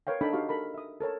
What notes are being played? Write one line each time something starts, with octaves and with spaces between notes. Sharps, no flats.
A#4 B4 C#5 F5 G5
D4 D#4 A4 G5 A5 B5
D#4 F#4 G4 F5 C#6
A4 A#4 B5
E5 D#6
A4 A#4 C#5 A5